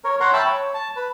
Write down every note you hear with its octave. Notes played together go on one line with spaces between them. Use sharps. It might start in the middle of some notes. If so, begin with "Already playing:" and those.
A#4 C#5
A#4 C#5 F#5 A#5 C6
E5 G5 A5 B5
C#5
A5
B4